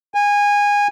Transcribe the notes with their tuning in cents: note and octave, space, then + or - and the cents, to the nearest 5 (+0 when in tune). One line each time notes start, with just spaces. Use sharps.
G#5 -20